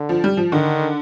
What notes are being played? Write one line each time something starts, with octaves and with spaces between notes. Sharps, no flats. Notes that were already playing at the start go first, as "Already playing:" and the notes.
Already playing: D3
F3
G3
F3
D3 D#3